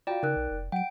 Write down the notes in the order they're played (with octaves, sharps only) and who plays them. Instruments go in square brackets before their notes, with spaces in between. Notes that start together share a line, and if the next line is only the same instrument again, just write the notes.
[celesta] F4 F#4 F5 [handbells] D5 G5
[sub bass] C#3 [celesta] D#4 A#4 F#6
[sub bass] B1
F1
[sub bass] F#3 [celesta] F#5 [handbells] G5 D7